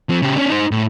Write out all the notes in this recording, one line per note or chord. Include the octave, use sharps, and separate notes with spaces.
F3 C4
C#3 G4
C#4 D4
D#4 C5
A2